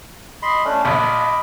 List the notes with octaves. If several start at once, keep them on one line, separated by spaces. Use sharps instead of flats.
D#5 B5 C6
A3 C#4 D4
A#1 D#5 B5 D6